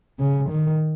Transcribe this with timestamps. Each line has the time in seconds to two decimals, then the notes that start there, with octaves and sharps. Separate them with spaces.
0.19 C#3
0.49 D#3